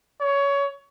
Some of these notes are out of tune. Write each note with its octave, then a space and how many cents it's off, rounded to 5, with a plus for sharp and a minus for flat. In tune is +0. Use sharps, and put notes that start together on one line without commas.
C#5 +20